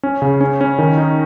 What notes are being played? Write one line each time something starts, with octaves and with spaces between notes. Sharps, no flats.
C#4
C#3
C#4
C#4
D#3
D#4